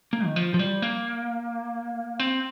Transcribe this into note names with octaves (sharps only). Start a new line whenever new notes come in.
A#3
D#3
F3
F3
G3
A#3
C4